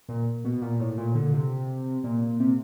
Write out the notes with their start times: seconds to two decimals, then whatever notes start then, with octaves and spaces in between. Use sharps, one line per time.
0.09 A#2
0.44 B2
0.62 A#2
0.80 A2
0.98 A#2
1.15 D3
1.34 C3
2.04 A#2
2.40 C3